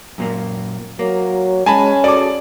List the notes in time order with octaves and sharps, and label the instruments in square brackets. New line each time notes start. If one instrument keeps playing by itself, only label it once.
[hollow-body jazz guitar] F#2 A#2 A#3
[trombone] F#3 [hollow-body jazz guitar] A#3
[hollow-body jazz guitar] G#3 [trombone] C#4 [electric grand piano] G#5 A5 B5
[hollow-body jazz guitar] F#4 G#4 A4 [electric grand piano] D5 D6